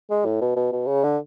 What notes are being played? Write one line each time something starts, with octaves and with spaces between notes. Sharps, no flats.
G#3
A2
B2
B2
B2
C#3
D3